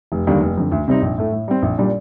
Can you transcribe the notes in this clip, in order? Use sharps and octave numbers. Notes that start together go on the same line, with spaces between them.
F1
D#2 D3 G3 A#3
F1
F2 D3
D2
C3 G3 C4 D#4
A#1
A2 A3
A2
G3 C4
A#1
A#2 G3 D4